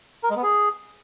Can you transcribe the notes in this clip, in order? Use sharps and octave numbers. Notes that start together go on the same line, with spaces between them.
A#4
G#3
B3
G#4